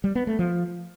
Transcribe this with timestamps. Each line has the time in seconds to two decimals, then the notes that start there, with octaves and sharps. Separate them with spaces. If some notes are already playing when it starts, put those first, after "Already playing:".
0.04 G3
0.15 B3
0.27 A3
0.39 F3